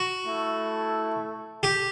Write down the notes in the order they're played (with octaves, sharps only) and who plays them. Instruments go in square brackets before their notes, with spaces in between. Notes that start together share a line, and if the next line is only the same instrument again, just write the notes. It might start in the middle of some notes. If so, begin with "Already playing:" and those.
Already playing: [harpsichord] F#4
[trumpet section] A3 E4 A4
[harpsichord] G4